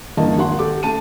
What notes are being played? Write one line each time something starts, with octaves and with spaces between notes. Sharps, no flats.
E2 G2 A#3 D#5 A5
G#1 F#4 F#5 C6
G4 A4 D6
A3 A5 D#7